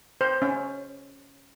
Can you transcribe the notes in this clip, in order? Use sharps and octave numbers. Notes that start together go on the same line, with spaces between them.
C5
C#4